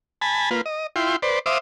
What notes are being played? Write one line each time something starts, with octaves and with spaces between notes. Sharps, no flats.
G#5 A5 B5
A#3 F4 B4
D#5
E4 F4 G5 C6
B4 C5 D5
C5 E5 F5 D6 D#6